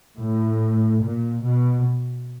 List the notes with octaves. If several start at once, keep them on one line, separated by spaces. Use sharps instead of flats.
A2
A#2
B2